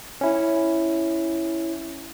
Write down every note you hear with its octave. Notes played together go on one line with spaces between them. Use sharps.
C#4 E4